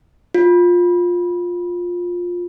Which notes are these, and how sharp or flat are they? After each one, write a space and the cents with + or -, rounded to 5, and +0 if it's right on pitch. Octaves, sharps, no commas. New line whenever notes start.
F4 +15